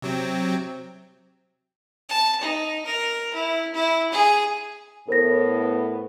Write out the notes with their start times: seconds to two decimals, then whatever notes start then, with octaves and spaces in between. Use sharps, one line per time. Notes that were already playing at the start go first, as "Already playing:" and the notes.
0.02 C3 F#3 C4
2.09 A5
2.41 D#4
2.86 A#4
3.34 E4
3.73 E4
4.12 G#4
5.08 A2 B3 A#4 C5 A#6